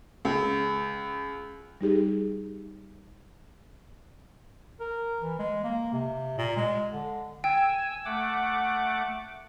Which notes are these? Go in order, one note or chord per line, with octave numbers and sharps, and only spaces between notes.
C#2
G3 D#4 G4 G#4
A#4
E3
G#3
A#3
C3
A#2
G#3
D3
G5 G#5 E6
A3 F#5 D6